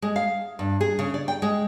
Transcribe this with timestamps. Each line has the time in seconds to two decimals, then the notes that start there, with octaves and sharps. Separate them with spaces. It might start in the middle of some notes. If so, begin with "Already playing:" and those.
0.02 G#3
0.16 F5
0.59 G2
0.81 G#4
0.99 C#3
1.14 D5
1.28 G5
1.42 G#3